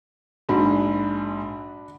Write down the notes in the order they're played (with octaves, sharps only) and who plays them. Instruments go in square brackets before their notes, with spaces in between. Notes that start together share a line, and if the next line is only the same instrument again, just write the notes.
[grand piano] A#1 G#2 [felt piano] D4 F#4 B5